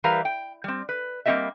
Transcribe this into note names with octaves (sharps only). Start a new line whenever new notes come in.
E3 G3 A#4 B4 F5 A#5
G5
G3 C4
B4
G3 A#3 C4 G4 D#5 E5